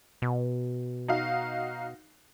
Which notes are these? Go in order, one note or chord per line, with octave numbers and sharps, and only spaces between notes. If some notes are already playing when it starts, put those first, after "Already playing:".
B2
D#4 F#4 F5